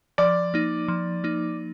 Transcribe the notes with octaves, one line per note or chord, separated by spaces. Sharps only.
F3 D5
A#3 D#4
F3
A#3 D#4